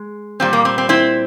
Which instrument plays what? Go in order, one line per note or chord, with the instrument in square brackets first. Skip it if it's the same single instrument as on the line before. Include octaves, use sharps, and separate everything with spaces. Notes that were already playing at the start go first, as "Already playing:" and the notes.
Already playing: [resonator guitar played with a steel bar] G#3
A#2 G3 C4
A#3
C4
C4
C4 E4